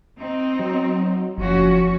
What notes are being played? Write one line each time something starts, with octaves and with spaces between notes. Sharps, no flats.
C4 D#4
F#3
F#1 F3 C#4 F#4